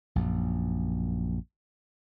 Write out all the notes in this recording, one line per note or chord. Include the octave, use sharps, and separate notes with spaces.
A#1 F#2